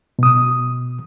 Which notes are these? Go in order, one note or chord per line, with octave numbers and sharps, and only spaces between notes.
B2 D#6